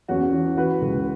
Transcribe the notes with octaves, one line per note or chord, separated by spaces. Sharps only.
E2 C#4 F#4
E3
E3 F#4 B4
C#2